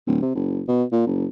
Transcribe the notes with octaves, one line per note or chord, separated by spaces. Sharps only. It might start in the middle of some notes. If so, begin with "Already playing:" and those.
D1
C3
F#1
B2
A#2
F#1